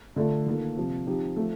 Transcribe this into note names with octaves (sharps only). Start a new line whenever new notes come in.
D3 A3 D4 F4 A4
D#3 A#3 F4 A4
C3 F3 C4
F3 C4 D#4 G4
F3 A3